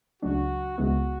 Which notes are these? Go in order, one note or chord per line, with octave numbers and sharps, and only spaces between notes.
C#2 C#3 F#3 A3 D4 F#4
C#2 C#3 G#3 B3 E4 F#4